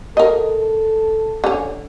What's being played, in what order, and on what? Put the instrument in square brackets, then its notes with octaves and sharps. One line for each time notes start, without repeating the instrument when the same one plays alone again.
[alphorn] A4 [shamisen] A#4 D#5
[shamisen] D3 C#4